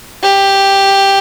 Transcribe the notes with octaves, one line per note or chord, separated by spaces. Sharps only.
G4